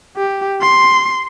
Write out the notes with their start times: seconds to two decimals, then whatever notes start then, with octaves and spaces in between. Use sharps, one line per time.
0.16 G4
0.61 C6